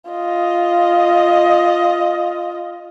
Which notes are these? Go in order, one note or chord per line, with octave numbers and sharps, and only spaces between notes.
F4 D#5